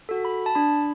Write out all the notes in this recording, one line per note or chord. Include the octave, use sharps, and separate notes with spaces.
F#4 A4
B5
A5
D4 B5